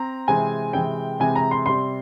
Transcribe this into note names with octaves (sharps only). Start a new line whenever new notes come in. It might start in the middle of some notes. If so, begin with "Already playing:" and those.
Already playing: C4 A#5
C3 E3 G#3 C4 G#5
C3 E3 G#3 C4 G5
C3 E3 G#3 C4 G#5
A#5
C6
C3 G3 C4 C6